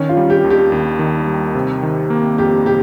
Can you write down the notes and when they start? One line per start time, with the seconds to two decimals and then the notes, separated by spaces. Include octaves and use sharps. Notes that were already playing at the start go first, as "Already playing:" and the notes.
Already playing: D#3 C#4
0.09 F4
0.17 G3
0.30 G4
0.44 D#2
0.50 G4
0.72 D#2
0.99 D#3
1.27 G3
1.55 C3
1.83 D#3
2.10 A#3
2.38 F2 G4
2.66 C3 G4